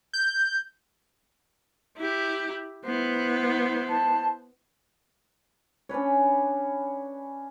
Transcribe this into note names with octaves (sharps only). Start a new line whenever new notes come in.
G6
E4 G4
B3 E4 C5
A5
C#4 D4 B4 C#5